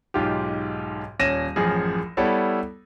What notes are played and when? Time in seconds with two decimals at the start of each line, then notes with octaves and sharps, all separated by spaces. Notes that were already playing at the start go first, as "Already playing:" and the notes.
0.14 B1 G#2 F4 G4
1.19 D#1 C#4 A#6 D#7 E7
1.56 A1 F#2 F3 G#4
2.17 G3 B3 E4 A4 C#5